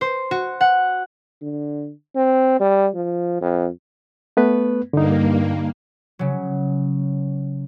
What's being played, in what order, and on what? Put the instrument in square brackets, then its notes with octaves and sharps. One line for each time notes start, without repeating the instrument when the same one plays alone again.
[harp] C5
F#4
F#5
[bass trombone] D3
C4
G3
F3
F2
[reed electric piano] A3 B3 B4
[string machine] G2 A#3 [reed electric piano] D3 D#4
[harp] C#3 F#3